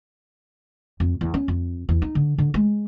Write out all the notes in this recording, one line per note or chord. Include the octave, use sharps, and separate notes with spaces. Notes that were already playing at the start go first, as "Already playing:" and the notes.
F2
E2
C#4
F2
E2
D#4
D3
D3
G#3